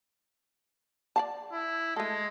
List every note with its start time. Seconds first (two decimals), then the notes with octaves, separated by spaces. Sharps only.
1.16 D5 F5 A5
1.52 E4
1.96 G#3 A3 A4